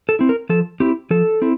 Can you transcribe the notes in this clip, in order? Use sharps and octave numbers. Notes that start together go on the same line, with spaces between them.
A4
C4 E4
A#4
F3 A4
C4 E4 G4
F3 A4
C4 E4